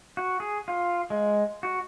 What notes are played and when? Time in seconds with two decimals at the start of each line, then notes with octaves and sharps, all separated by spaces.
0.17 F#4
0.40 G#4
0.68 F4
1.10 G#3
1.63 F#4